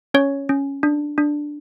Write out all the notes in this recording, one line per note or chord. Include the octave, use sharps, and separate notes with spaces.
C#4 C#5
C#4
D4
D4